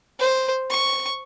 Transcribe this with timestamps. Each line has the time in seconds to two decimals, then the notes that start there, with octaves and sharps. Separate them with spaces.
0.19 C5
0.70 C#6